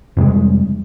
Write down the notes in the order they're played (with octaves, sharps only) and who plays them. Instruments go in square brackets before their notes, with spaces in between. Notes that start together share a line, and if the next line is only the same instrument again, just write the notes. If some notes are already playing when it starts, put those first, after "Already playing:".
[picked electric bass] F2 C3 G3 G#3